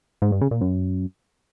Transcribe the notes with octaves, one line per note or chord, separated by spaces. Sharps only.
G#2
G2
C#3
A#2
F#2